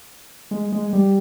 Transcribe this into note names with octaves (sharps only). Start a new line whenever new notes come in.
G#3
G#3
G3